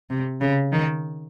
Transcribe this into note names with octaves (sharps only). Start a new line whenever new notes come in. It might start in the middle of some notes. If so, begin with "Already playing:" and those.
C3
C#3
D#3